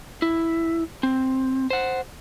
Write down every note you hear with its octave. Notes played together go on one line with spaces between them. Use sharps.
E4
C4
C5 F#5